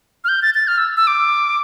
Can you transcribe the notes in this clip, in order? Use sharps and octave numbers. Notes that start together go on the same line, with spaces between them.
F6
G6
A6
A6
F6
E6
E6
D6